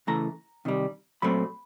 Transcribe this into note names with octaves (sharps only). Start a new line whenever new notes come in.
C#3 E3 A3 A#5
C3 D#3 G3
A#2 F#3 A3 C4 B5